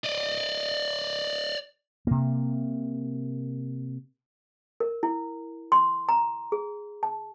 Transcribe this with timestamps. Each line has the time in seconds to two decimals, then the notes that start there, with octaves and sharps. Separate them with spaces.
0.04 D5 D#5
2.07 C3 A#3
4.80 A#4
5.03 E4
5.72 C6
6.09 A#5
6.52 G#4
7.03 A5